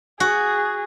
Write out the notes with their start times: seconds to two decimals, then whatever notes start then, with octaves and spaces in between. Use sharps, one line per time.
0.20 F#4 G#4